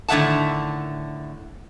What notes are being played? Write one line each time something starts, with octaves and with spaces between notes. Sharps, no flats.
A2 D3 D#3 E5 F#5 A5